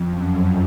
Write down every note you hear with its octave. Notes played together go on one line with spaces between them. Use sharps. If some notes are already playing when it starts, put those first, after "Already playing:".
Already playing: F2
F#2